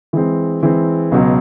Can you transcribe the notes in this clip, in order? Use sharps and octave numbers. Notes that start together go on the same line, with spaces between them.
E3 G#3 C4
E3 G#3 C4
C#2 B2 F#3